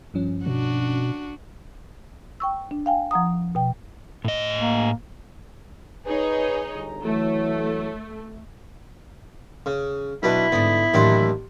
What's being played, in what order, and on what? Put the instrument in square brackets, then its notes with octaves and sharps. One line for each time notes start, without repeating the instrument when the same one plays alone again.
[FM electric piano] G2 F3 C#4
[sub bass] B2 [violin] D4 F#4
[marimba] G5 C#6 E6
D4
F5 G5 G#5
F3 F#5 A#5 D#6
B2 G5
[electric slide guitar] A2 D#5
[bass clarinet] A#3
[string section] D#4 G#4 C#5 [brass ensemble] B4
[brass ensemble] G1 A#5
[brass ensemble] E3 F#3 C#5 [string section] A3
[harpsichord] C#3
[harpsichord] B1 D4 B4 [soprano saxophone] E4
[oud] G#2 D3 [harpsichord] B3
[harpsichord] D#2 D4 C6 [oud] A2 E3 F#3